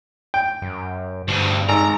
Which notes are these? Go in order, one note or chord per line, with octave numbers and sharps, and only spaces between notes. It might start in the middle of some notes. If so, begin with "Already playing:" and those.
G5
F#2
D2 G2 B2
G#1 A#5